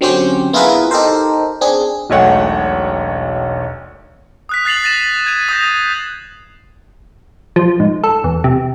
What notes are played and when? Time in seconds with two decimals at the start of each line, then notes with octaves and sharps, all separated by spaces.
0.01 D3 F#3 C4 C#4 G4 C5
0.53 B3 E4 F4 G#4 A#4 B4
0.91 D#4 G4 A4 A#4 C5
1.61 C4 D4 G#4
2.10 E1 B1 A3 C#5 F#5 G5
4.49 D#6 F#6 B6
4.65 F#6 A6 C7 F7 F#7
4.84 A6 A#6 D#7 E7 F#7
5.26 G#6 D#7
5.49 D#6 G6 A#6
7.56 F3
7.80 G#2
8.04 A4
8.24 E2
8.44 C3